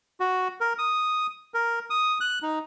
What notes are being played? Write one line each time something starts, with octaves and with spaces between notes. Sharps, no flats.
F#4
A#4
D#6
A#4
D#6
F#6
D#4